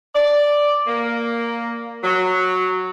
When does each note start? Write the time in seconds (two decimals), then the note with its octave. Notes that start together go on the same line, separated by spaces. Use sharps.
0.14 D5
0.87 A#3
2.02 F#3